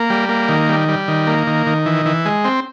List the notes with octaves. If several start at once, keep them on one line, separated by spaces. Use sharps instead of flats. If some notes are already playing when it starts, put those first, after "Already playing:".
Already playing: A#3
G3
A#3
D#3
G3
G3
D#3
A#3
D#3
D#3
E3
E3
G#3
C4